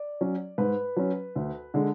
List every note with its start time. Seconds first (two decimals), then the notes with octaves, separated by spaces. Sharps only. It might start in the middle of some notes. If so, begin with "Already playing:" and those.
Already playing: D5
0.21 F#3 C#4
0.58 G#2 B4
0.96 F#3 C#4
1.36 D2
1.74 D3 G#3 D4